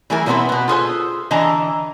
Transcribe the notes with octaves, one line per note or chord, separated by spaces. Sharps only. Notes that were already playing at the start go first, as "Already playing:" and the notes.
E3 G3 A3 E4 G#4 A#4
B2 G3 B3 C4 E4 B4
B2 B3
F4 G#4 A4 C5
D3 E3 E4 D#5 A5 A#5